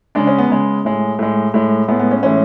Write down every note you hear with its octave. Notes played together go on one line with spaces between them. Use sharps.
C#3 G#3 D4
C#4
B3
C#3 G#3
A2 G#3
A2 G#3
A2 G#3
A2 G#3 B3
B3
C#4
A2 E3 G#3 C#4